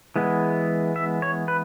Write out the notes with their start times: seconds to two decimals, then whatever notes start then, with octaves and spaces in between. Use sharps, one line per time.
0.16 E3 G#3 B3
0.96 E5
1.22 C#5
1.48 B4